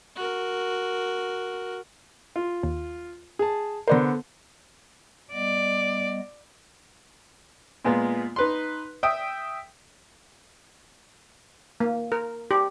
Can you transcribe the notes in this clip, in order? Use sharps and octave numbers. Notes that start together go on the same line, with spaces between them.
F#4 A#4
F4
D#2
G#4 A5
D3 B3 A#4 C5 D5 A#5
G3 B3 D5 D#5
A#2 G#3 B3 F4
D#4 B4 C6
E5 G5 D#6
A#3
A#4
G4